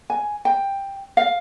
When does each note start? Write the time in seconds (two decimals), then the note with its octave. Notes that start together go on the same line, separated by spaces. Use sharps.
0.10 G#5
0.45 G5
1.17 F5